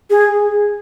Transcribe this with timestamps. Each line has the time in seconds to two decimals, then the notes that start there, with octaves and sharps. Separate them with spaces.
0.10 G#4